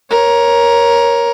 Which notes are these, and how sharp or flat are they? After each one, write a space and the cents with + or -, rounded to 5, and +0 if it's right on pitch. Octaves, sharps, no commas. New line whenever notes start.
A#4 +15 C#5 +0